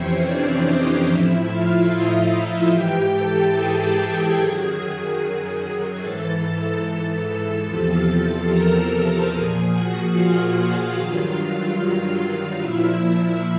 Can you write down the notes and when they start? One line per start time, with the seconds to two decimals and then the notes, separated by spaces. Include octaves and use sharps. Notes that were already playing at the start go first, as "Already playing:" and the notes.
Already playing: F2 C3 E3 C4 C#4 C5 C#5
0.24 D4 D5
0.66 D#4 D#5
1.06 A2 F3 E4 E5
1.48 F4 F5
1.89 D#4 D#5
2.30 F4 F5
2.71 G#2 E3 G4 G5
3.13 A4 A5
3.54 G#4 G#5
4.36 F#2 D#3 F#3
5.19 G#4 G#5
5.60 G#4 G#5
6.01 G#2 E3 A4 A5
6.42 A4 A5
6.83 A4 A5
7.66 E2 C3 F3
8.48 A#4 A#5
9.31 A#2 F3 G#4 G#5
9.72 F#4 F#5
10.13 F4 F5
10.95 G2 D#3 F#3 F4 F5
12.60 A#2 F3 E4 E5